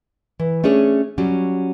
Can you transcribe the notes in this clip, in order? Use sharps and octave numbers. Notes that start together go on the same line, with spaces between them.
E3
A3 C#4 D4 G#4 C#5
F#3 G3 C#4